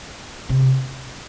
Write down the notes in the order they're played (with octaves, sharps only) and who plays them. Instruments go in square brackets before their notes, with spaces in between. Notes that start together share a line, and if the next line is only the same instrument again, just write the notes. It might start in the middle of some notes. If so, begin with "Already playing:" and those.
[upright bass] C3